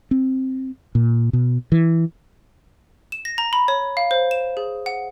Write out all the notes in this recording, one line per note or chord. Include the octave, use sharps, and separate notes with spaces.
C4
A#2
B2
E3
E7
A#6
A#5
B5
C#5
F5
C5
E7
G#4
F#5